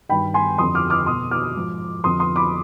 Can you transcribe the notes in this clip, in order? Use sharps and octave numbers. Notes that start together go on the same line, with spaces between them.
G2 D#3 G5 B5
G#5 C6
F2 D3 F3 C6 D#6
D6 F6
D6 F6
B2 C6 D#6
D6 F6
G#2 F3
F2 D3 F3 C6 D#6
C6 D#6
B5 D6